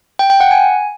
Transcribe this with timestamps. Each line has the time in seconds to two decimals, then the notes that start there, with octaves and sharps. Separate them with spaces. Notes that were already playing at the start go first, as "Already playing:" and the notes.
0.19 G5
0.30 G5
0.40 F#5
0.51 G#5